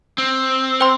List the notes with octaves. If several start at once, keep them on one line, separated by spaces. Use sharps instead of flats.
C4
C5 G5 C6